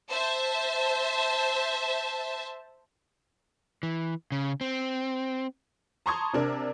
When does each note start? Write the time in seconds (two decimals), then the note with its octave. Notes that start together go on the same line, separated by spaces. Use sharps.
0.10 C5 E5 A5
3.83 E3
4.32 C#3
4.61 C4
6.06 A5 A#5 C6 C#6 D#6 G#6
6.34 C3 D4 A#4